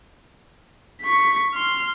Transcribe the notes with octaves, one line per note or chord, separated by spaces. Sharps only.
C#6 B6
C6 F6